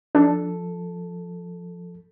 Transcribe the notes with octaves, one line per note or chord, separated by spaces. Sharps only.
F3 D4 A4